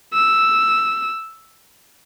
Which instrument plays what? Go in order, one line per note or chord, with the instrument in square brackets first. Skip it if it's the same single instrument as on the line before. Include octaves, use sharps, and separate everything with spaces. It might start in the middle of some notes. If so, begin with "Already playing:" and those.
[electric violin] E6